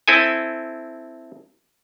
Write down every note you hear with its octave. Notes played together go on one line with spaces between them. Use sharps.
C4 E4 A4 G#5